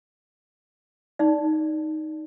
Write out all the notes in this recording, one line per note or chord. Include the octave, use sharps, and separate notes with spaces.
D#4 D5